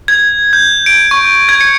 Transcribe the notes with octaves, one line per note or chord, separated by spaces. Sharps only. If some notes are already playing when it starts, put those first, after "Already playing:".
G#6
G6
D7
C#6
G#6
C#7